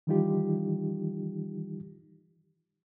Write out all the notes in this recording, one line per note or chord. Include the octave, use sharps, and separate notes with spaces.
D#3 E3 G3 D#4 F4 G4